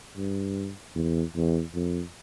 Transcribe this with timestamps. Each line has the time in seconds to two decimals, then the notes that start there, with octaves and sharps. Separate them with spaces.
0.17 G2
0.95 E2
1.35 E2
1.75 F2